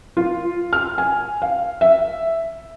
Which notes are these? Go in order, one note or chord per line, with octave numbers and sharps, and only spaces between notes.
F4
F6
G#5
F5
E5